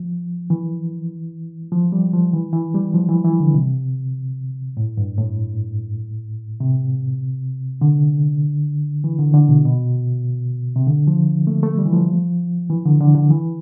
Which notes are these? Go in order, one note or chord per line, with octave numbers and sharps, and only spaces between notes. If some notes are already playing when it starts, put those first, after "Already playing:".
Already playing: F3
E3
F3
G3
F3
E3
E3
G3
F3
E3
E3
D3
C3
A2
G2
A2
C3
D3
E3
D3
D3
B2
B2
C3
D3
F3
A3
A3
G3
E3
F3
E3
D3
D3
D3
E3